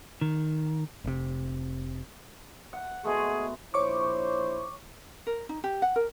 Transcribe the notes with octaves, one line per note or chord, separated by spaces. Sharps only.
D#3
F1 C3
F#5
B2 G#3 A3 G#4
A#1 E4 C5 C#5 C#6 D6
A#4
D#4
G4
F#5
A#4